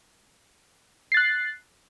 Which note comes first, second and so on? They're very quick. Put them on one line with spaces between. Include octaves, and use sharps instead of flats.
C7 A6 F#6